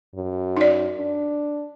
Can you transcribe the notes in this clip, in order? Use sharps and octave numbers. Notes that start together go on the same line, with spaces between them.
F#2
D#4 D5
D4